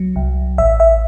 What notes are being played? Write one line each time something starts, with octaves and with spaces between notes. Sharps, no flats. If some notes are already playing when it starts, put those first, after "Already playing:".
Already playing: C2 F#3
C2
A1 E5
E5